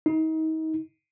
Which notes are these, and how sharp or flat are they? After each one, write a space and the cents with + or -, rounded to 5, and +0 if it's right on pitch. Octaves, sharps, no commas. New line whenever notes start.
D#4 +35